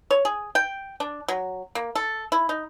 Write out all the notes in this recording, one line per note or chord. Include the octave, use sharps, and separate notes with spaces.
C#5
G#4
G5
D4
F#3
A#3
A4
E4
D#4